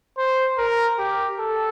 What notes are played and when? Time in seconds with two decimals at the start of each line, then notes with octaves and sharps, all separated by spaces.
0.18 C5
0.58 A#4
0.99 G4
1.40 A4